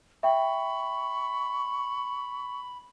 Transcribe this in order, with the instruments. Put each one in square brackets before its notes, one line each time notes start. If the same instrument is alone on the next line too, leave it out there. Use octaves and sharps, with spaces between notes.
[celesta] E5 G5 [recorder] B5 [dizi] C#6